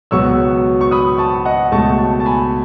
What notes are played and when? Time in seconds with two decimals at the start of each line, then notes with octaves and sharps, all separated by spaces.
0.11 C#2 B2 F#3 B3 C#6 E6
0.81 C#6
0.91 B5 D#6
1.18 A5 C#6
1.45 D#5 F#5
1.71 C#2 B2 A3 A5 C#6
1.98 A5 C#6
2.20 A5
2.26 G#5 B5